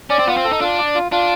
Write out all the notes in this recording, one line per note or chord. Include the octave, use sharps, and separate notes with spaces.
C#4 D5
C4
B3 F4
C4
A4
D#4
D4 F4
D5
F4
D4 F4